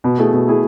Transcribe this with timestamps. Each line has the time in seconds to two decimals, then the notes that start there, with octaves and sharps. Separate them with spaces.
0.04 B2
0.18 A3 E4 G#4
0.33 B2
0.47 A3 E4 G#4